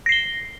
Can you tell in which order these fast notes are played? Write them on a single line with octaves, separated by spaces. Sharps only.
A#6 C7 G7